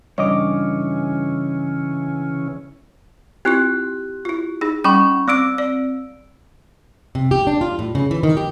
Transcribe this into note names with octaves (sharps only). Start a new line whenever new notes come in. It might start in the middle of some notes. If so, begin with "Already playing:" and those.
G2 C#3 E3 C#4 C#5 D#5 D6
C4 E4 F4 G4 F#6
E4 F4
D#4 G#4
G3 C#4 G5 B5 C#6
C4 D5 D6 E6 D7
D5
C3
G4
D4
F4
A2
C#3
E3
D#3
G4